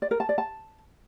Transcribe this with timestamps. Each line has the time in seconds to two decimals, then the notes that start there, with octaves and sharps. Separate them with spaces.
0.02 D5
0.11 A#4
0.20 A5
0.29 D5
0.38 A5